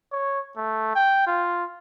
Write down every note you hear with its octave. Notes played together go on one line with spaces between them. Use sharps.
C#5
A3
G5
F4